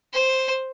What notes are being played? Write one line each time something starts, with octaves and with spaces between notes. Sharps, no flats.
C5